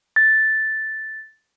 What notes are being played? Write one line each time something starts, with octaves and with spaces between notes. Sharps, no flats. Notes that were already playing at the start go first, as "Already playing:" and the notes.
A6